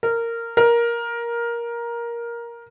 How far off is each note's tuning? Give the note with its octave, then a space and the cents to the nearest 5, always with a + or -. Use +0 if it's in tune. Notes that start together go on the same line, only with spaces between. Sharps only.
A#4 -15
A#4 +10